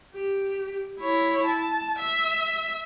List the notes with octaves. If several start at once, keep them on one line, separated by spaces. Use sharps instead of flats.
G4
E4 C#5
A5
E5